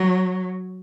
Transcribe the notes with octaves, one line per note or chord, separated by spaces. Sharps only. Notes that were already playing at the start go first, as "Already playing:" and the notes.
Already playing: F#3